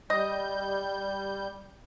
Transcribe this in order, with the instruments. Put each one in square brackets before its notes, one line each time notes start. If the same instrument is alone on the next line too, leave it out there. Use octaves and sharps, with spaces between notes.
[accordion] G3 G6 [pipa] D#5